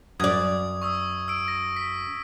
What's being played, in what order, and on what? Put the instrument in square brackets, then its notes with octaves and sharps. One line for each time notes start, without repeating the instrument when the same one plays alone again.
[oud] F#2 D5 [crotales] D#6 G#6
[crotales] C#6 D#6 E6
E6 D7
A#6
B6